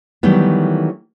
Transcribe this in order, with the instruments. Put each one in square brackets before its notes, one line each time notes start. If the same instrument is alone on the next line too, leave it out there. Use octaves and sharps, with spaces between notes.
[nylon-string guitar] D#3 E3 F#3 G3 A3 B3